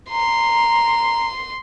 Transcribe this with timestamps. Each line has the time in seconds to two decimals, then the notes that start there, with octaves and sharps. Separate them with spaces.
0.10 A#5 C6